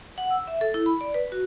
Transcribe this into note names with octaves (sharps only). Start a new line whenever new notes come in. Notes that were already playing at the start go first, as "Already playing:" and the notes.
F#5
E6
E5
A4
E4
B5
D5
B4
F#4